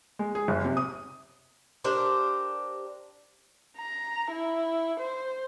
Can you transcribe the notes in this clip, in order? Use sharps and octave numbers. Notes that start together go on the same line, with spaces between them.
G#3
G#4
F#1
C3
D#6
D4 G4 A#4 C5
A#5
E4
C5